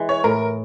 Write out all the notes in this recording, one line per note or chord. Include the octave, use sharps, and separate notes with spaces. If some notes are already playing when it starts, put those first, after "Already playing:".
Already playing: E3 G#3
C#5
A2 A#4